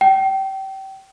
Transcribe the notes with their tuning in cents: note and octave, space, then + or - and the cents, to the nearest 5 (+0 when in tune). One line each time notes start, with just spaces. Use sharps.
G5 -25